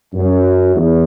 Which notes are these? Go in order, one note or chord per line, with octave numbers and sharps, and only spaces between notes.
F#2
E2